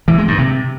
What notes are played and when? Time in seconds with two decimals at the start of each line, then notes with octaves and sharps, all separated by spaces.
0.08 E3
0.18 G#3
0.28 G2
0.38 C3